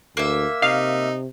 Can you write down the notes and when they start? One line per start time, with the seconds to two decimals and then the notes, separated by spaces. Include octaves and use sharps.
0.17 D2 A#3 E5
0.62 C3 D#4 F5